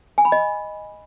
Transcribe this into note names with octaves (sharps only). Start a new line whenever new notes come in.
G#5
B5
D#5